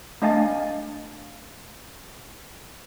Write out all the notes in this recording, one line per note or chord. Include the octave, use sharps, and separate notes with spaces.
A3 D4 D#5 F5 G#5 A6